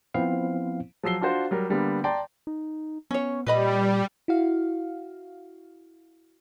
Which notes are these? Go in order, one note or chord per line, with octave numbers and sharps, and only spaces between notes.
F3 B3 C4 E4 C5 F5
F3 F#3 E6 C7 G7
D4 F4 F#4 C5
F#3 G3 A#4
D3 G3 A#3 B3
D5 G5 A5 A#5 C6
D#4
B3 C#4 C#5
A#2 G3 B4 D#5 B5
E4 F#4 F5